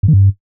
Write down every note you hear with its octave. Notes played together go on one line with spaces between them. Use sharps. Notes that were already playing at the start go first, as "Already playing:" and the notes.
G2
D#3
G2